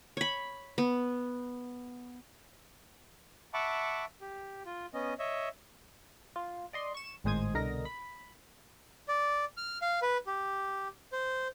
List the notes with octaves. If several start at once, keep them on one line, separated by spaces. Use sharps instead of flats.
C#5 B5
B3
E5 F#5 A5 B5 C#6 D6
G4
F4
B3 C#4 D#5
C#5 D#5 E5
F4
D5 D#5 C6
C#6 E7
G#1 A2 G#3 C5 D#6 G#6
C2 B2 D3 A#4 D#5 A#6
B5
D5
F6
F5
B4
G4
C5